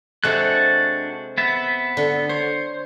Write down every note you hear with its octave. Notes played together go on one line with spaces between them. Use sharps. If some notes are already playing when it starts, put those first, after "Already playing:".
C3 G#3 D4 F#4 A4 F#6
B3 E5
D3
C5 C#5